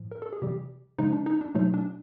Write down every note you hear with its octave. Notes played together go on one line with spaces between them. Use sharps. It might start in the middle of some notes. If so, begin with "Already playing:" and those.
Already playing: A2 F3
A#4
A4
G#4
C3 E3 G3 G4
C#3 F3 G#3 D#4
D4
D#4
D4
B2 F#3 A3 D#4
D4